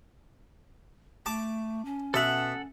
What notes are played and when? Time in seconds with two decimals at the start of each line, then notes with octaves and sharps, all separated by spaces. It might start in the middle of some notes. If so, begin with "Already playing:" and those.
1.26 A3 A5 D6
1.85 C#4
2.14 B2 A4 E5 F#5